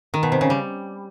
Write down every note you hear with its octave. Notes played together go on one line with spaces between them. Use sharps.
D#3
B2
C3
C#3
G3